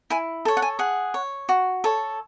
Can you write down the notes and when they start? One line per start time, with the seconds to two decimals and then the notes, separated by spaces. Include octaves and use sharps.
0.10 E4 G#5
0.45 A4 C#5
0.57 F#5
0.62 G#5
0.79 G#4 F#5
1.14 C#5
1.49 F#4
1.84 A4 C#5